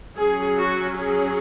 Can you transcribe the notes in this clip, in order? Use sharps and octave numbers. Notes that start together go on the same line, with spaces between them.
F#3 C#4 G#4
F#4
G#4